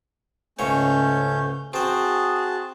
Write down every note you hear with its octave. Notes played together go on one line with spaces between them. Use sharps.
C#2 G#2 A3 C#4 C#5 G6
C4 F#4 G#4 C5 A5